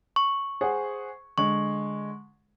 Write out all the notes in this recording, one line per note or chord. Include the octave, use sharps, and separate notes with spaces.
C#6
G#4 C5 F#5
D3 G#3 C#6